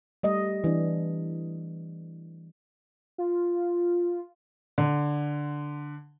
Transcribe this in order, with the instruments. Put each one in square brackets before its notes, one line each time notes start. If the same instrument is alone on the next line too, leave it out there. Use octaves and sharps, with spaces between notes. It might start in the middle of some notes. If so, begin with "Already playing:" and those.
[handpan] G3 A3 D#5
E3 D4
[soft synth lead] F4
[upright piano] D3